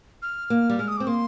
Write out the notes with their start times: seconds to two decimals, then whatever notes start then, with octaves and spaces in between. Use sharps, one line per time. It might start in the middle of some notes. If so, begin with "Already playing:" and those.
0.22 F6
0.50 A#3
0.69 G3
0.78 G#3 F6
0.88 D#6
0.97 C4 D6
1.07 A#3 C6